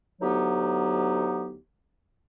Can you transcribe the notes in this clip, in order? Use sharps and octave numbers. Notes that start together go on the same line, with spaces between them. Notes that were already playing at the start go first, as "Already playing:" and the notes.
D2 F#3 B3 D#4 G4